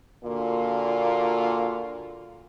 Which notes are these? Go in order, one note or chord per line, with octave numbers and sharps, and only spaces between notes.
A#2 D3 A#3 F4 F#4